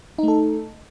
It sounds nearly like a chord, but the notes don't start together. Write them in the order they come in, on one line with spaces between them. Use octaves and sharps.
D#4 A3 A4